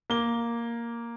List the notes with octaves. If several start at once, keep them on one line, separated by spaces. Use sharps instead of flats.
A#3 G7